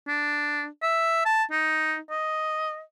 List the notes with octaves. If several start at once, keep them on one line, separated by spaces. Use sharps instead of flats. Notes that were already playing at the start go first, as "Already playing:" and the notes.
D4
E5
A5
D#4
D#5